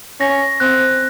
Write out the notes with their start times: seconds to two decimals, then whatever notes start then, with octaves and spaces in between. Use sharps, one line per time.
0.20 C#4 A#6
0.60 C4 F#6